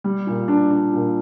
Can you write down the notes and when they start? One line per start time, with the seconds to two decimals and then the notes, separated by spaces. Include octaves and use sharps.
0.04 G3
0.27 A#2
0.48 D4
0.70 D4
0.93 A#2